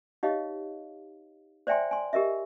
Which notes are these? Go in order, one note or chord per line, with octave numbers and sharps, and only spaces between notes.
D#4 G4 C#5 D#5 F5
C5 D5 E5 G5 G#5 C6
G#5 C6
G4 A#4 D#5 E5